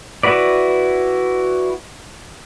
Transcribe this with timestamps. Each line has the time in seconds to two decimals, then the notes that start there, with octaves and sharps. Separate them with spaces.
0.23 E4 F#4 B4 D5